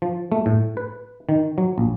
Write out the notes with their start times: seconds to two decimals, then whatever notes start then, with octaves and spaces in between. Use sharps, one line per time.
0.02 F3
0.32 A3
0.46 A2
0.77 B4
1.29 D#3
1.58 F#3
1.78 A#1